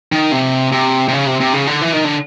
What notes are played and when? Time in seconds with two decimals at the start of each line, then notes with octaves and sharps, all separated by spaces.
0.12 D#3
0.32 C3
0.72 C3
1.08 C3
1.13 C#3
1.27 C3
1.40 C3
1.53 C#3
1.67 D3
1.81 E3
1.93 D#3
2.04 D3